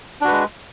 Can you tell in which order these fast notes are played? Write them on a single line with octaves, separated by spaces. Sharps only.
D4 F#4 B4 G#3